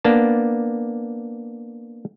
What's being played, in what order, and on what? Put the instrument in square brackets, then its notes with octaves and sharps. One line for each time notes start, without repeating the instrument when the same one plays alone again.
[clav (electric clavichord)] A#3 B3 D4 A5